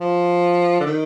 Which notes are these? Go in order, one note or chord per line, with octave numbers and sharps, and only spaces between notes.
F3
D3
D#3